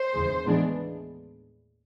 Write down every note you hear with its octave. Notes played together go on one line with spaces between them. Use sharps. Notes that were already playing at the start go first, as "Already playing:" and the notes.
Already playing: C5
D#2 C#3 E3 G#3
A2 E3 G#3 B3 D4